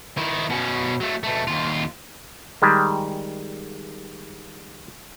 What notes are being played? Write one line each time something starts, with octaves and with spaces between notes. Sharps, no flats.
D#3 E4
B2 C#4
F#3 A3
B2 A3
D#2 F4
D#3 G3 G#3